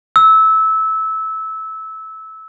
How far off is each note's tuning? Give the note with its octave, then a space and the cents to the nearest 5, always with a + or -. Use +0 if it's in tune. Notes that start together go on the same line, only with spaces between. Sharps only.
E6 -20